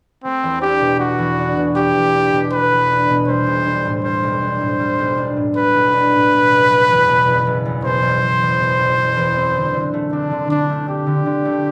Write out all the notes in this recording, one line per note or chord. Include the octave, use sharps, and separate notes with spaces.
A3 C4
E2
D4 G4
B2
A3 F#4
E2
D4
B2
A3 G4
E2
D4
B2
A3 B4
E2
D4
B2
G3 C5
B1
D4
A2
G3 C5
B1
D4
A2
G3
B1
D4
A2
G3 B4
B1
D4
A2
B2
F#1
F#1
E2
B2
F#1
F#1
E2
B2 C5
F#1
F#1
E2
B2
F#1
F#1
E2
C4
D3
D3
A3
C4 D4
D3
D3 D4
A3
C4 G4
D3
D3
A3